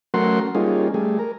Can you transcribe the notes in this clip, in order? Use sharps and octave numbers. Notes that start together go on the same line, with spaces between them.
F#3 A3 C#4 A#4 F#5 C6
G3 A#3 C#4 D#4 F4 G#4
G3 A3 G#4
A#4